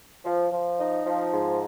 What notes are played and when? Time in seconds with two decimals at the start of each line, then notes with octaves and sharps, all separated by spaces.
0.25 F3
0.52 F3
0.79 D#4
1.05 F3
1.33 G#2